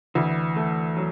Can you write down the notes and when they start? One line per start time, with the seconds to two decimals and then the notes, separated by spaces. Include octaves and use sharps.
0.15 D2 E3
0.56 A3
0.97 F#3